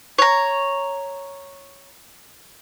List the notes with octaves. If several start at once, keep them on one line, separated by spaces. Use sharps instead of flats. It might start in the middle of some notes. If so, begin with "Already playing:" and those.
C#5 A#5